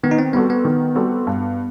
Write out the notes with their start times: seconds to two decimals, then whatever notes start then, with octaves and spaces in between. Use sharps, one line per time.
0.03 D#3 B3
0.11 D#4
0.18 C4
0.33 G3 B3 C4 F#4 A4
0.50 B3
0.65 D#3
0.95 G3 C4 F#4 A4
1.27 G2